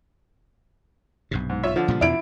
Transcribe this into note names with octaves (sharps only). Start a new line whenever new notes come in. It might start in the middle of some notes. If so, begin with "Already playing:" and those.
B1 G2 C3
G#2
F4 C#5 E5
D3 F3
A#2 C#3 G3
E2 B2 E4 D7